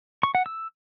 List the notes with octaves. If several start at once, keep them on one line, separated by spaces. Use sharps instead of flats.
C#6
F#5
E6